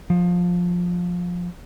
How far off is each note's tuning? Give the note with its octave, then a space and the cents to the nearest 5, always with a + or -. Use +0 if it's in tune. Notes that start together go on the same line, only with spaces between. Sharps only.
F3 +15